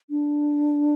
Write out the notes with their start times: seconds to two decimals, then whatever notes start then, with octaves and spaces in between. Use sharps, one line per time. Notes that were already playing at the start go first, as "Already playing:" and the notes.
0.10 D4